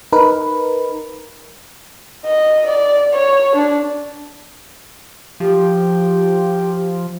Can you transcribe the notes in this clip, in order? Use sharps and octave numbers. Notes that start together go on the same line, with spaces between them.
D#4 A#4 B4
D#5
D5
C#5
D4
F3 G4